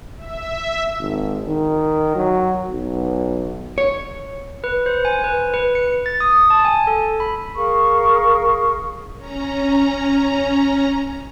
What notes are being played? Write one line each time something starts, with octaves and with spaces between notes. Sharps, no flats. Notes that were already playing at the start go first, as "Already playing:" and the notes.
E5
G#1
D#3
F#3
B1
C#5
B4
C5
G#5
B4
B4
C#7
A6
D#6
A5
G#5
A4
B5
G#4 A#4 F5 C#6
C#4 A#5